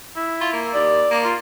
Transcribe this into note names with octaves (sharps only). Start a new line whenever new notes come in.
E4
F4
A#3
D#2 D5
A#3
F4